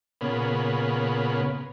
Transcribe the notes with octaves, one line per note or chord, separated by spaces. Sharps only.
A#2 C#3 B3